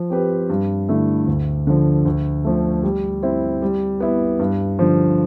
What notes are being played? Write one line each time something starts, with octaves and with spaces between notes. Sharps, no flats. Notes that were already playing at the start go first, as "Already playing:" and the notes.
Already playing: F3
C4 G4 B4
G2
D3 A3 E4
D2
D3 F3
D2
D3 F3 A3
G3
C4 E4
G3
B3 E4
G2
D3 F3